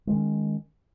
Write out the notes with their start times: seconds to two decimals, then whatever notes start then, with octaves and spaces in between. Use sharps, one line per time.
0.07 G#3
0.11 D#3
0.14 C#4